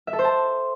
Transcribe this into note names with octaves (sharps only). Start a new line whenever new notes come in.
E5
A4
C5
A5